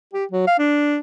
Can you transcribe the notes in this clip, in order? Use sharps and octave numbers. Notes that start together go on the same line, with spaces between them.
G4
F#3
F5
D4